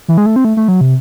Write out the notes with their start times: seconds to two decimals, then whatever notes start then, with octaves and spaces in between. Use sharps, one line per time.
0.08 E3
0.18 G#3
0.26 A3
0.36 C4
0.45 A3
0.57 A3
0.68 F#3
0.81 C3